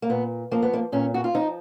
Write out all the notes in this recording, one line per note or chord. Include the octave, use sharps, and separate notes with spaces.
A#3
A#2 B3
F3 A#3
B3
A#3
A#2 C#4
F#4
F4
F3 D#4